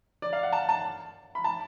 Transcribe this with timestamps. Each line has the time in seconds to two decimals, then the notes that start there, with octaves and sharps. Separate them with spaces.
0.22 D5
0.33 F5
0.43 F#5
0.52 A5
0.69 A5
1.35 B5
1.44 A5